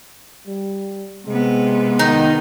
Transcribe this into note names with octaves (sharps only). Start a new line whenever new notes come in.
G3
C3 G#3 B3
D#3 D#4